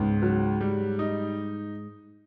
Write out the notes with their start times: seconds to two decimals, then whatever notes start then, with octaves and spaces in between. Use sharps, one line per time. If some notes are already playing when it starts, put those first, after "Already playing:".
Already playing: C#2 G#2 B3
0.22 F#3
0.61 G3
0.99 D#4